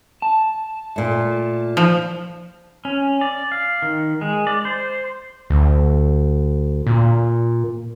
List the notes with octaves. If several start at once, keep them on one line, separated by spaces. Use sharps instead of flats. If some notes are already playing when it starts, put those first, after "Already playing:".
A5
A#2 A3
F3
C#4
D5
F5
D#3
G#3
D5
C5
D2
A#2